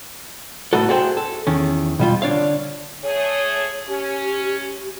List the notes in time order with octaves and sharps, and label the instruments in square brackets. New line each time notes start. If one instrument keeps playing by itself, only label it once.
[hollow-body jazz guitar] A2 A3 B3 D#4 F#4 A4
F#4 G#4 A4 C5 E5 G5
A4
E2 D#3 C#4
B2 G3 F4
D3 D4 C#5 F5
[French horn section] A3 G#4 [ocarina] C#5
[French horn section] C#4 [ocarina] G4